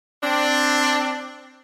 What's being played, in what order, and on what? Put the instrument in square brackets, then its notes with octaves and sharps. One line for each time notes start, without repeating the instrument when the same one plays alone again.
[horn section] C4 D4